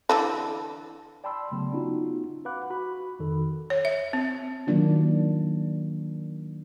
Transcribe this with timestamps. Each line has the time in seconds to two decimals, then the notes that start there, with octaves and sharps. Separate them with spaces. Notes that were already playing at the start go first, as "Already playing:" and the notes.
0.09 D3 E3 A4
1.24 D5 G5 A5 B5 C6 E6
1.52 C#3 F#3 A3 B3
1.72 B3 C#4 D#4 F4 F#4
2.45 B4 F5 F#5 B5 D6 F#6
2.70 F#4 B5
3.19 F2 D#3 A4
3.70 C#5
3.85 E5
4.13 C4
4.67 D#3 F#3 A#3 D4 F4